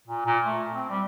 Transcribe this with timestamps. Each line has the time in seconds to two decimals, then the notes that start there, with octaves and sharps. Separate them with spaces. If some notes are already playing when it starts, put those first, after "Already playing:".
0.08 A#2
0.26 A#2
0.45 A3
0.74 C4
0.90 G3